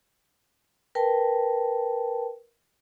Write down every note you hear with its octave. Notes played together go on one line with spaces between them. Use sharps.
A#4 B4 G5 A5